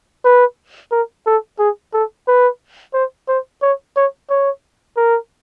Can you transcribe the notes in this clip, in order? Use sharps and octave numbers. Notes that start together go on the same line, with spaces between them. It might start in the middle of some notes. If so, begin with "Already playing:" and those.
B4
A#4
A4
G#4
A4
B4
C5
C5
C#5
C#5
C#5
A#4